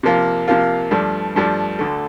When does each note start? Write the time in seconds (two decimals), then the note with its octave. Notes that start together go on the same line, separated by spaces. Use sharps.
0.03 C3 F3 A#3 F4
0.48 C3 F3 A#3 F4
0.91 G2 F3 A3 D4
1.36 G2 F3 A3 D4
1.79 D2 D3 A3